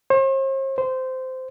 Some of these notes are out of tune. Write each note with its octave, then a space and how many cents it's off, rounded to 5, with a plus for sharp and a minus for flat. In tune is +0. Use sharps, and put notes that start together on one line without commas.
C5 +45
C5 -15